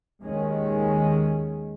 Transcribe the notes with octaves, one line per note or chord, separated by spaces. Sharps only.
D#2 D#3 G#3 C#4